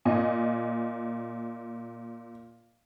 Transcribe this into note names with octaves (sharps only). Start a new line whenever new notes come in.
A#2 D#5 G#5